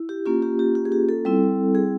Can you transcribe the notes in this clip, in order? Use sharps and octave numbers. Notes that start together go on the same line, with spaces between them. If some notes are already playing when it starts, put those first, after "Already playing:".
Already playing: E4
G4
A#3 C#4 F4 G4
G4
G4
G4
G#4
G4
A4
G3 C4 E4
G#4